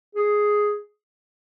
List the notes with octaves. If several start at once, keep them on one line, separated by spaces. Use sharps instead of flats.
G#4